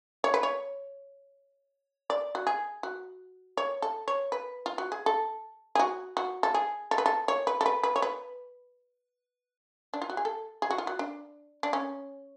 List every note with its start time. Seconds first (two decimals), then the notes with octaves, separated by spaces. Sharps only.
0.24 C#5
0.34 B4
0.43 C#5
2.10 D5
2.35 F#4
2.47 G#4
2.83 F#4
3.57 C#5
3.82 A4
4.08 C#5
4.32 B4
4.66 F4
4.78 F#4
4.92 G#4
5.06 A4
5.75 G#4
5.79 F#4
6.17 F#4
6.43 A4
6.54 G#4
6.91 A4
6.98 B4
7.06 A4
7.28 C#5
7.47 B4
7.61 A4
7.66 B4
7.83 B4
7.96 C#5
8.02 B4
9.94 D4
10.02 F4
10.09 F#4
10.17 G#4
10.25 A4
10.62 G#4
10.70 F#4
10.78 F4
10.87 F#4
10.99 D4
11.63 D4
11.73 C#4